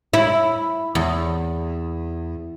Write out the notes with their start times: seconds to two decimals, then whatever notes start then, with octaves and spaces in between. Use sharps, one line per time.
0.13 E4
0.95 E2